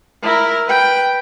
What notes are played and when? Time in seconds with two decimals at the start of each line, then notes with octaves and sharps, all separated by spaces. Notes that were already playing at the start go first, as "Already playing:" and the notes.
0.22 E4 A#4
0.66 B4 G5